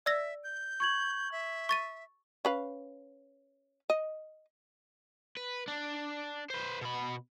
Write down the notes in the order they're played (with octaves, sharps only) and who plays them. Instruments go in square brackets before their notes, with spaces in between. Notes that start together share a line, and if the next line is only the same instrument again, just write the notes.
[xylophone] D5 E6 A#6 [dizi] E5
[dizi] G6
[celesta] C#6 G#6 F#7
[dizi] E5
[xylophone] C#6 A6 D#7
[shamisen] C#4 B4 F5
D#5
[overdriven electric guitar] B4
D4
B4 C5
B2 B5